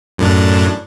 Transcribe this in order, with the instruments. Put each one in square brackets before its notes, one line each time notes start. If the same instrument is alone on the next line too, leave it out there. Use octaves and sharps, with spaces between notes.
[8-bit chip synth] F#2 A2 D4